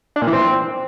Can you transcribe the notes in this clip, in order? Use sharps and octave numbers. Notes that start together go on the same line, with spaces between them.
D4
A#2
E3
C4